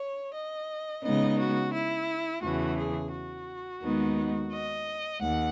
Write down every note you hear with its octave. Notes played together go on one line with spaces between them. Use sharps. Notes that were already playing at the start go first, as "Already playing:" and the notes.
Already playing: C#5
D#5
C#3 G#3 B3 D#4 D#5
F#4
E4
E2 C#3 E3 A3 F#4
G#4
F#4
D#2 D#3 G#3 B3 D#4
D#5
D#2 F#5